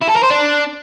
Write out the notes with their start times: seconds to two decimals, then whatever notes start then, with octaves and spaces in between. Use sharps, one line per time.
0.02 E4
0.09 A4
0.16 A#4
0.23 C5
0.31 D4